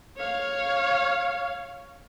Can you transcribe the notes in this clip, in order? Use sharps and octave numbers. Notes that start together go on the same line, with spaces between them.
C#5 F5